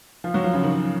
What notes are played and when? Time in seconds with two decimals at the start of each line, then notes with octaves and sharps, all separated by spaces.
0.24 F3 F4
0.34 F#3 F#4
0.44 F3 F4
0.53 C#3 C#4
0.63 D#3 D#4